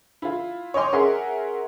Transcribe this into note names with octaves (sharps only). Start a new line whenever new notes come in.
E4 F4
C#5 D#5 G5 C6 D6
C#4 G#4 A#4 E5 F#5 C6